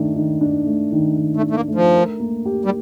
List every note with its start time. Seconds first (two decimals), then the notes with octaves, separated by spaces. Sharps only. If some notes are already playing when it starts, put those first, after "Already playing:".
Already playing: D#3 A3 D4
0.16 D#3
0.41 D4
0.66 A3
0.92 D#3
1.17 D#3
1.36 A3
1.42 D4
1.50 A3
1.55 A#3
1.68 A3
1.75 F3
1.94 A#4
2.20 A#3
2.46 G4
2.65 G3